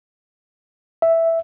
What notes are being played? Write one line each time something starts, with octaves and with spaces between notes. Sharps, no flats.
E5